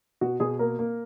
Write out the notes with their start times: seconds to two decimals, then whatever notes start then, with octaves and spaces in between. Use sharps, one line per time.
0.21 B2 F#4
0.40 B2 G#4
0.59 A#3 A#4
0.79 A#3